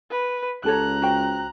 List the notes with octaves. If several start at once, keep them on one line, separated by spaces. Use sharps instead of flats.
B4
C#2 G4 A4 C#5 A#5 F#6
F#4 C5 G5